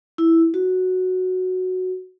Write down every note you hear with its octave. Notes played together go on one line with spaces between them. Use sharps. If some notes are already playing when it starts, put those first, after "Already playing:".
E4
F#4